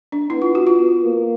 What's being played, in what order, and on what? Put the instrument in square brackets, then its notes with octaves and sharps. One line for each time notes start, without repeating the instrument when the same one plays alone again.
[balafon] D4
[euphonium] B3 [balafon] E4
[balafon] F4
F#4
F4
[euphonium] A#3